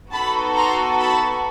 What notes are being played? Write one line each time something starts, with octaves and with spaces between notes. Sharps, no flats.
B3 D#4 F#4 A4 A5 B5
A#5 C6
A5 B5